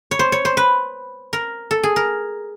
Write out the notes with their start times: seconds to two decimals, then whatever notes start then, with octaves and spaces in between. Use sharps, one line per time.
0.11 C#5
0.19 C5
0.32 C#5
0.45 C5
0.57 B4
1.33 A#4
1.71 A4
1.83 G#4
1.96 A#4